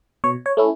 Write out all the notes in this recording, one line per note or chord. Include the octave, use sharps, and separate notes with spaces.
B2 C#5
C#5
A3 C#4 E4